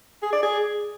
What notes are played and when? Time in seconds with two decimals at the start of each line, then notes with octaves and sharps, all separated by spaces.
0.23 G#4
0.33 D5
0.43 G#4